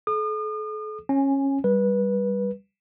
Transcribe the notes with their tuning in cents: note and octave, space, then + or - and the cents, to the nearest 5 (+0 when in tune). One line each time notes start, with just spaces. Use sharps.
A4 -40 D#6 -40
C#4 -20 G#5 +0
G3 +0 B4 -20